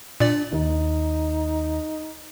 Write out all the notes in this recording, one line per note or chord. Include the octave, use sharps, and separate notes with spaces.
A#2 D4 D5
D#2 D#4